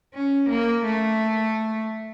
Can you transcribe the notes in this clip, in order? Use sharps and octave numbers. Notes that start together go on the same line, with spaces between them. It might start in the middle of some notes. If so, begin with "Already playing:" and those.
C#4
A#3
A3